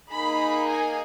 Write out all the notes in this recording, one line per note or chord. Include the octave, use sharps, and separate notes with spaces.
A#3 D#4 G#4 B5
G#5